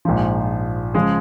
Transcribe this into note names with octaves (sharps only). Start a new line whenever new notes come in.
A#1 G#2 F3
C#3 F3 G#3 G#4